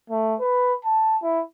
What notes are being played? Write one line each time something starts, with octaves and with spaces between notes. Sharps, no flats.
A3
B4
A5
E4